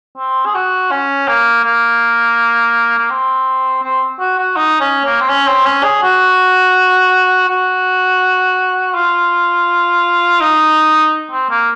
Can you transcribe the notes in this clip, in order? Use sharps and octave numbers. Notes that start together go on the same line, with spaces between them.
C4
G#4
F#4
C#4
A#3
A#3
A#3
C4
C4
F#4
F#4
D#4
C#4
A#3
C4
C#4
C4
C#4
G#4
F#4
F#4
F4
D#4
C4
A#3